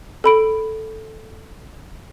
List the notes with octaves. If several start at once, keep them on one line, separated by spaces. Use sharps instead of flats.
A4 B5 D7